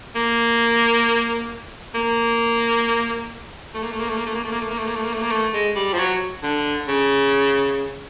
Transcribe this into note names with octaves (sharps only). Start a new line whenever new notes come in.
A#3
A#3
A3
A#3
A3
A#3
A3
A#3
A3
A#3
A3
A#3
A3
A#3
A3
A#3
A3
A#3
A3
A#3
A3
G#3
G3
F3
F#3
D3
C#3